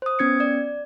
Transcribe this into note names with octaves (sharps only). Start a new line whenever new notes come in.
C5 D#6
B3 C#4 G#6 C#7
D5